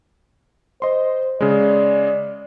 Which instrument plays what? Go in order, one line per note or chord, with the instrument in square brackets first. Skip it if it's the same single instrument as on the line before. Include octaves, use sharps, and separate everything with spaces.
[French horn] C5 [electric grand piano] D#5 C6
[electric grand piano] C#3 G#3 [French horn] D5